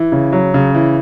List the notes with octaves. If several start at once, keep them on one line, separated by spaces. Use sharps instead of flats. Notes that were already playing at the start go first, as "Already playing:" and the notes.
Already playing: E3
C#3
F#3
C#3
E3